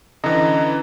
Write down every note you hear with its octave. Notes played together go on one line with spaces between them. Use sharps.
D3 E3 C#4 D#5 A#5